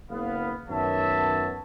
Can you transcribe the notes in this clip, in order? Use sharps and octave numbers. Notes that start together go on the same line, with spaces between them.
F#1 B3 F5
F#2 D#3 B3 C#5 E5 A5